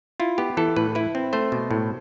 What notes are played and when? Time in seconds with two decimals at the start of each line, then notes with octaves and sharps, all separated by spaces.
0.20 E4 F4
0.38 B3 G4
0.57 E3 A4
0.76 A2 B4
0.95 E4 B4
1.15 C4
1.33 A3 C5
1.52 B2
1.71 A2